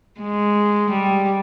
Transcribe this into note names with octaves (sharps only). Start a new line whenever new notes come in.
G#3
G3